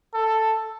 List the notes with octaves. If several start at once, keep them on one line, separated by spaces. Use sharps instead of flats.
A4